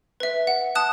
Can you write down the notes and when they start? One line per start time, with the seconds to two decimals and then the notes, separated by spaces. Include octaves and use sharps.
0.20 B4 E5
0.47 F#5
0.75 A5 D#6 F#6